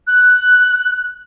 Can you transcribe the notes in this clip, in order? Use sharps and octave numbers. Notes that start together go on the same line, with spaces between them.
F#6